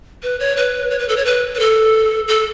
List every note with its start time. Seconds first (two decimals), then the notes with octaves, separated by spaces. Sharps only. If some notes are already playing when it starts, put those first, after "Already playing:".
0.23 B4
0.40 C#5
0.57 B4
0.91 C#5
0.99 B4
1.09 A4
1.17 C#5
1.25 B4
1.55 B4
1.59 A4
2.28 A4